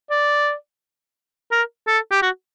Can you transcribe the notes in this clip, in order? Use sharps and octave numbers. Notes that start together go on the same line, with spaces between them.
D5
A#4
A4
G4
F#4